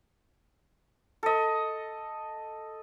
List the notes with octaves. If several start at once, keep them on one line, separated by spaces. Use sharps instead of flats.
A4 D#5